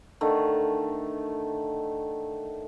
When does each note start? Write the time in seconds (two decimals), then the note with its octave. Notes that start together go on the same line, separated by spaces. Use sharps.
0.21 D3 D#3 A3